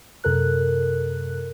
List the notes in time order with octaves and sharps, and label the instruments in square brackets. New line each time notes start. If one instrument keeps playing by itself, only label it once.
[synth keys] F#2 C3 A4 A#4 F#6